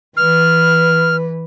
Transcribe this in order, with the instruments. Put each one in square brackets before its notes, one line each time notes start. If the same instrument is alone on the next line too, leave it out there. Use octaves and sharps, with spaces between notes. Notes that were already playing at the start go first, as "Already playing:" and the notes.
[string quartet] E3 B4 [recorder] F6